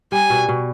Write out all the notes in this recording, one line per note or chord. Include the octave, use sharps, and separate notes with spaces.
G3 G#5
B2
B2